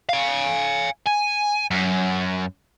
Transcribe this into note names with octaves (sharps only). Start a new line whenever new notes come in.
F5 G#5
G#5
F#2